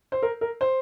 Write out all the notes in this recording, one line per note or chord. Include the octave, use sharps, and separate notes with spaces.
C5
A#4
A#4
C5